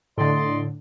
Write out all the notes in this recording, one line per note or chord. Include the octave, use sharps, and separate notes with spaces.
A2 D3 D5 D#5 C6